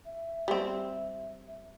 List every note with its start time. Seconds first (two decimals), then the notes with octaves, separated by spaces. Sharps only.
0.05 E5
0.48 G3 C4